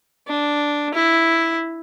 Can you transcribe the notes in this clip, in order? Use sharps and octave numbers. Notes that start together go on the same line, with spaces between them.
D4
E4